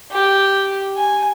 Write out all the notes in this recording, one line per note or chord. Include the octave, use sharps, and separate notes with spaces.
G4
G#5